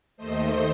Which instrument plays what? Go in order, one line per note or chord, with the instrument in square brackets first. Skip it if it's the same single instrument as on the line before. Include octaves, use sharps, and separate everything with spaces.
[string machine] D#2 D#3 A3 C5 D#5